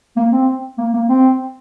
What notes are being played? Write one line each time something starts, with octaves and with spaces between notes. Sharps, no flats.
A#3
C4
A#3
A#3
C4